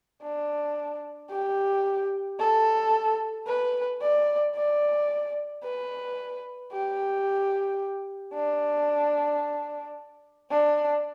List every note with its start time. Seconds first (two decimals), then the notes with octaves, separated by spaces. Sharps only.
0.23 D4
1.30 G4
2.39 A4
3.47 B4
4.01 D5
4.55 D5
5.63 B4
6.72 G4
8.34 D4
10.51 D4